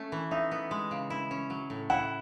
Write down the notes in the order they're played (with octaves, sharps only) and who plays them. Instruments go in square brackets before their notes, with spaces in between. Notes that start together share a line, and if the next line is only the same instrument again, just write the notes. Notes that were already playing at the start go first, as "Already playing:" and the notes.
Already playing: [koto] A3 C#4
E3
[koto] D#4 [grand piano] E5
[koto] B3
G#3
C#3
E4
C#4
F#3
A2
[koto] E4 [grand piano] F#5